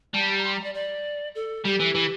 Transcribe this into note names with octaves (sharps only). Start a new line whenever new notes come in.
G3 A5
A#5
C6
A#5
D5
D5
A4
G3 G4
E3
E3